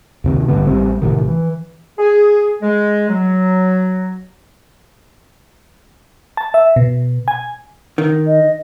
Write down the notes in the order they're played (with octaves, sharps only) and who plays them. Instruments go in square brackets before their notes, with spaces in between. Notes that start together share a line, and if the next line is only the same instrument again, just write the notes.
[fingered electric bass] D#2 C3 D#3
A1 G2 D3 B3
A1 G3 C4
G#1 A2 C3 D#3
E3
[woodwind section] G#4
G#3
F#3
[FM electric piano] A5
E5
B2
G#5
[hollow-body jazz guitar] D#3
[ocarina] D#5